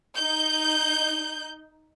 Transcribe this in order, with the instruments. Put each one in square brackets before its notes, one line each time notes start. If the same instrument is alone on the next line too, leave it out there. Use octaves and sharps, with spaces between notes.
[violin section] D#4 G6